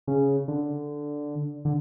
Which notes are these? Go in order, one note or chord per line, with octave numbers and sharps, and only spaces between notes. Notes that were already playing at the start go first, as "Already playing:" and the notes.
C#3
D3
D3